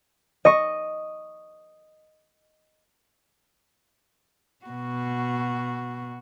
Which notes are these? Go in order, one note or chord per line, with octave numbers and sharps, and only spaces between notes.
D#5 C#6
B2 F#4